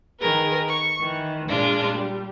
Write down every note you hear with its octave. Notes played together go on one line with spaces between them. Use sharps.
D#3 G#4 A#4 B4
C#6
D#3 E3
A#2 G#3 D4 F4
G3